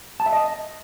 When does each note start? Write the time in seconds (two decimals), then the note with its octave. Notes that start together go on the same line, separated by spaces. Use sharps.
0.20 A5
0.26 E5
0.33 D#5